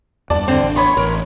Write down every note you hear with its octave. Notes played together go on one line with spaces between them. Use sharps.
E2 G2 D5 A5
D3 C4
A1 D4
B3 C#5 B5 C6
A1 A#4